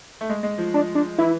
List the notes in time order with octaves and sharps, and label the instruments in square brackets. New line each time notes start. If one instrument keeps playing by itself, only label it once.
[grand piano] A3
G#3
G#3
F3
[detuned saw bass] D4
D4
[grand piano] E3 [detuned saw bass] E4